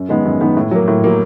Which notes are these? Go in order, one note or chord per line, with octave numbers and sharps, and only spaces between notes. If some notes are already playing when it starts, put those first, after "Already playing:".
Already playing: F#2
D#3 G#3 B3
F#2
D#3 G#3 B3
A2
F#3 A#3
A2
F#3 A#3